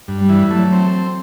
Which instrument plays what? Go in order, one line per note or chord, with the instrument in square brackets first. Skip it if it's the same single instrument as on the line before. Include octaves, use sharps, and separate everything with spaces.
[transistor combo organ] G2
[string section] G3
[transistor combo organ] E3
[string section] F#3 [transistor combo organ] A3
[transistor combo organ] C4